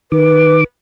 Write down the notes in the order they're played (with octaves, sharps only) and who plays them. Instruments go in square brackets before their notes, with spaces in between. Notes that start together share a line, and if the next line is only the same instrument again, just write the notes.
[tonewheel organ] D#3 D6 [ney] B4